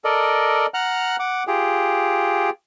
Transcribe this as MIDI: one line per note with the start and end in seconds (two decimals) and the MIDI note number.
0.04 0.66 69
0.04 0.66 70
0.04 0.66 74
0.04 0.66 75
0.74 1.16 78
0.74 1.16 82
0.74 1.16 89
0.74 1.16 90
1.19 1.43 78
1.19 1.43 86
1.47 2.50 65
1.47 2.50 67
1.47 2.50 68